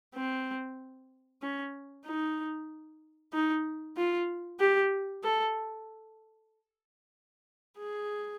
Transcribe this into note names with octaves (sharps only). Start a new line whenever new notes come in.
C4
C#4
D#4
D#4
F4
G4
A4
G#4